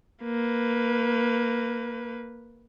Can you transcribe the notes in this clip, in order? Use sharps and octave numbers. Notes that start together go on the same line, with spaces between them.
A#3 B4